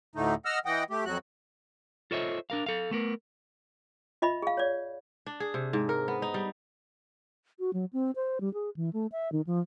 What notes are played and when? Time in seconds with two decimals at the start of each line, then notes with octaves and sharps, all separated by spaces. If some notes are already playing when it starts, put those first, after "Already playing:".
0.16 D2 A2 D3 A3 D#4
0.45 D#5 F#5 E6 F6
0.65 E3 D#5 F#5 G5
0.90 A3 G4
1.05 F2 F#3 F#4 F#6
2.11 F4 A4 C5 C#5 D#5 E5
2.50 D4 A#4 F5
2.66 A4 F5
2.91 A3 B3 A#4
4.22 F4 D#5 E5 B5
4.42 G#4 F5
4.57 C#5 D5
5.26 D4
5.40 G#4
5.54 C3
5.73 G#2
5.89 A#4
6.08 B3
6.22 D#4
6.34 G3
7.59 F#4
7.73 F#3
7.93 C4
8.16 C5
8.41 G3
8.54 G#4
8.76 E3
8.93 A3
9.12 E5
9.32 D#3
9.47 F3